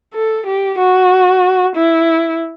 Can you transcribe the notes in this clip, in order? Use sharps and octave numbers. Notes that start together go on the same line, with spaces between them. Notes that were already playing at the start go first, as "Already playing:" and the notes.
A4
G4
F#4
E4